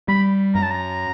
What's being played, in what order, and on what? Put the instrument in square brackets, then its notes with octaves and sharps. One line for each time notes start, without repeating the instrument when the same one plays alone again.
[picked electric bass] G3 [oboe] B5
[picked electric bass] F#2 [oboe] A#5
[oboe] A5
A#5